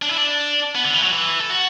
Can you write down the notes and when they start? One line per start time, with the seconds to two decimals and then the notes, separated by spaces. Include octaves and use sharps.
0.02 D4
0.09 E4
0.17 D4
0.75 B3
0.85 D3
0.94 E3
1.03 F#3
1.13 E3
1.40 A4
1.50 F#4